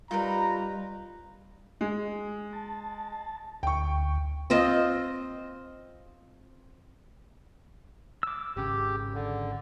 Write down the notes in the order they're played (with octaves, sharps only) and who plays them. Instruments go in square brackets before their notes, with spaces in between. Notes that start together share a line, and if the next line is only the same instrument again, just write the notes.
[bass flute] G3 [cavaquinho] D#4 A#4 B4 [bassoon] F4 [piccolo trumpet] A#5
[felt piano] G#3
[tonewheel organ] A5
[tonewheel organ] D2 [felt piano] G5 C#6
[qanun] C4 F4 C5 D#5
[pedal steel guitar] D6 E6
[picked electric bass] G#1 C#3 [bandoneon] G4
[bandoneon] D3